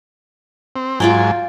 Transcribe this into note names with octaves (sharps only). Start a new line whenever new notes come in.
C4
G#2 F#3 F4 D5 G5 G#5